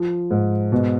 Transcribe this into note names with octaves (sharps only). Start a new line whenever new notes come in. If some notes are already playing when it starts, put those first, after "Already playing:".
Already playing: F3
G#2
B2